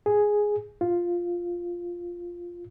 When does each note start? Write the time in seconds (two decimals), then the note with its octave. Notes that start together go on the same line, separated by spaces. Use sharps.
0.06 G#4
0.81 F4